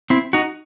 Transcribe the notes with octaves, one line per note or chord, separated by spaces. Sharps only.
C4 E4
D#4 F#4